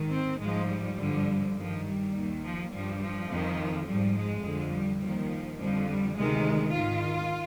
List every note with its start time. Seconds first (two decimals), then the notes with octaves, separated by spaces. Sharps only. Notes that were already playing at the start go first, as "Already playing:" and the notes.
Already playing: G#2 D#3
0.12 C4
0.40 G#2 F3 G#3
0.69 G3
0.98 G2 D3 F3
1.55 G2 D#3 F3
1.85 G3
2.13 D#2 D#3
2.42 F3
2.71 G2 F3 G3
3.00 F3
3.28 F2 D#3
3.86 G#2 F3 G3
4.15 G#3
4.43 F2 D3 F3
4.72 G3
5.01 D#2 D#3 F3
5.59 F2 D3 F3 G3
5.87 G3
6.16 D2 C3 D#3 G#3
6.74 G#2 D#3 F4